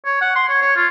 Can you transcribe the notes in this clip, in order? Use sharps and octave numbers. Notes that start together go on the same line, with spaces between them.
C#5
F#5
C6
C#5
C#5
F4